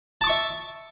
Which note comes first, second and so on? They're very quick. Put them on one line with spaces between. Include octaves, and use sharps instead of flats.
A5 D6 C#6 E5